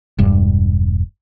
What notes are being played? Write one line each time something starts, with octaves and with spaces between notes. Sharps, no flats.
E1 G2